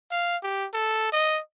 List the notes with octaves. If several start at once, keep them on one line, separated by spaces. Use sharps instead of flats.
F5
G4
A4
D#5